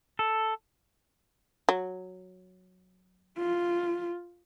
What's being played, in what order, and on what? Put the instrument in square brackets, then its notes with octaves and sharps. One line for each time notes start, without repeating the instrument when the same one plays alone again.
[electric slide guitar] A4
[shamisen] F#3
[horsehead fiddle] F4